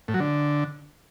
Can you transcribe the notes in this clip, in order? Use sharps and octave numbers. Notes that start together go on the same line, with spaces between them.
A2
F#3
D3